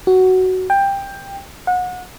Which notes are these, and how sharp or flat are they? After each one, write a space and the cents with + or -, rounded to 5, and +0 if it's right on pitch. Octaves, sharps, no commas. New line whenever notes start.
F#4 +10
G5 +15
F#5 -30